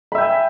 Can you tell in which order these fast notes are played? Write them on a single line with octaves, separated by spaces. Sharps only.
B5 E5 G5 G#5